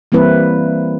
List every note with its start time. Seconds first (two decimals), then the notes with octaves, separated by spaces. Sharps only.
0.12 E3 G3 A#3 C4 E4 B4